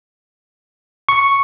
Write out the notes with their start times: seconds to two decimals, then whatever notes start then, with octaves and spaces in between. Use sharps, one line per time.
1.09 C#6